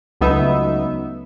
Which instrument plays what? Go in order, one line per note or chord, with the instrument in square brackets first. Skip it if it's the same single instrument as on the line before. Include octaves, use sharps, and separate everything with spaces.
[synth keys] C#2 F#3 A3 B3 D#4 E5